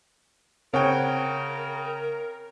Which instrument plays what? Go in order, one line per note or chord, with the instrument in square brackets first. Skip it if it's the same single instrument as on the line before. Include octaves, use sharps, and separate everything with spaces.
[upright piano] C#3 G5 [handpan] C4 C#5 F#5 [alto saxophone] A#4